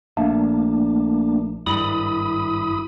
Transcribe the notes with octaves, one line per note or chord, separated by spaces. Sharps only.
A#1 A3 A#3 D4
G#1 G2 E4 B5 D#6